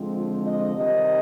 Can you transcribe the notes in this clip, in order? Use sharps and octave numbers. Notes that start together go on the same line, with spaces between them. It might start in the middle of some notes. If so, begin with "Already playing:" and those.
Already playing: D3 F3 G#3 C4
F4
D#5
C3 D#3 G3 D#5